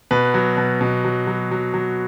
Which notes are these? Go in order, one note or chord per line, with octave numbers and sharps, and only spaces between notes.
B2 B4
F#3
B2
B2
F#3
F#3
F#3
F#3